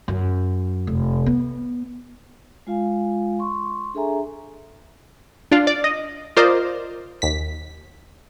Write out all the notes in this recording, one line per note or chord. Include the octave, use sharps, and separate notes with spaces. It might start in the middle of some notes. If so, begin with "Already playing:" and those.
F#2
F1
B3
G#3 F4 F5 G#5
C6 C#6
D4 G#4 A4 E5 G#5 A#5
D4 F4
D5
D#5
F4 A#4 C5 D5 D#5
D#2 B6